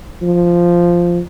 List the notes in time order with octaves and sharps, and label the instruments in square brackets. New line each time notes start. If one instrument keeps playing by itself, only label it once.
[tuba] F3